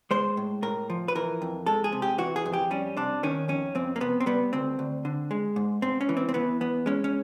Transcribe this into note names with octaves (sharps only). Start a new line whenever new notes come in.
G#3 C5
A2
A2 A#4
F3
B4
E3 A#4
F2
G#3 A4
G#4
C3
G4
E3 F#4
G#4
F2
G4
G3 C#4
C3 D4
D#3 C#4
F2 C#4
F2 C4
A#3
C3 B3
C4
G3 B3
D2 C4
D2
D3
G#3
G#2
G#2 C4
C#4
E3
C4
C4
E3 B3
E2 B3
G#3 C#4
C#4